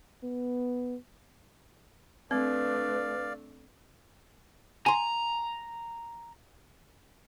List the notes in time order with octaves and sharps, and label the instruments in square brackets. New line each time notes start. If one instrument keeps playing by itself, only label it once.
[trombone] B3
[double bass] A3 D4 [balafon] C4 [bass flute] B4 [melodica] D5 F5
[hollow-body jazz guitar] G#5 C6 [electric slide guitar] A#5